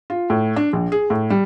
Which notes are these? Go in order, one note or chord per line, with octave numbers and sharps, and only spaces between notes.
F4
A2
D4
A#1
G#4
A2
G3